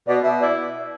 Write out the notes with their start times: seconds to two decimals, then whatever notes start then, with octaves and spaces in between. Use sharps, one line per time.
0.07 B2 D5
0.23 B2 E5
0.40 E4 D5